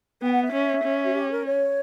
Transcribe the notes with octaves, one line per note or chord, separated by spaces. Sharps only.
B3 G5
F#5
E5
C#4
C#4
F#4
G4
A#4
C#5